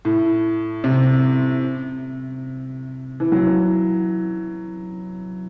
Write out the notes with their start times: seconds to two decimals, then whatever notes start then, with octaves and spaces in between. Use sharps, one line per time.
0.05 A2
0.84 C3
3.20 E3
3.32 F#3
3.46 E3